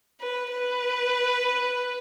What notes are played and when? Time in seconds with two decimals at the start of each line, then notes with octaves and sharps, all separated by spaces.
0.20 B4
0.51 B4